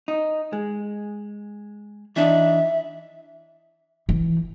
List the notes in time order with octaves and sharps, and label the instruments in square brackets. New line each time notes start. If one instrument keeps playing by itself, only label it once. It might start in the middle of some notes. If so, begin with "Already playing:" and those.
[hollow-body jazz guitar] D#4
G#3
[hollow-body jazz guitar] E3 D4 D#4 [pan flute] E5
[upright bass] E3